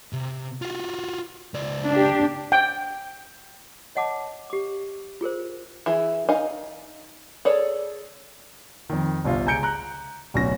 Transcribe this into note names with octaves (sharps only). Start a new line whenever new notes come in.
C3
F4 F#4
C#2 D5
D4 G4
G5
C#5 D#5 F#5 A5 D6
G4 D6
F4 G#4 A#4 C5
E3 E4 G#4
D#4 D#5 F5 G#5
G#4 A4 C#5 D5
F2 D#3
G1 C2 F4
C#2 G#5 A#5 G6 C#7 D7
A#5 F#6
D1 B1 C#4 F#4 A#6